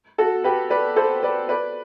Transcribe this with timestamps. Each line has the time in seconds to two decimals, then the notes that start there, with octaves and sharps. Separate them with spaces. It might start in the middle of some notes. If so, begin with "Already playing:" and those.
0.18 F#4 A4
0.44 G4 B4
0.70 B4 D5
0.96 A4 C5
1.23 B4 D5
1.49 B4 D5